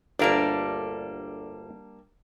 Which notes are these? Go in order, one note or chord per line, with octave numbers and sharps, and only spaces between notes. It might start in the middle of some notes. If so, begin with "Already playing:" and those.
G1 D2 G3 A#3 D4 A#4